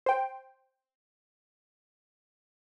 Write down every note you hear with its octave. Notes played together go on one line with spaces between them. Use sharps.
C5 G5